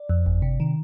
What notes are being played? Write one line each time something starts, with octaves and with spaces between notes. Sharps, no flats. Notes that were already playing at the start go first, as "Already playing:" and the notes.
Already playing: D5
F2
G1
C3
D#3